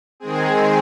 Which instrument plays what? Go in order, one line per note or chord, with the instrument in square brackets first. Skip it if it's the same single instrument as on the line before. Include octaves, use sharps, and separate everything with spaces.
[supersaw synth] D#3 G#3 C4 G#4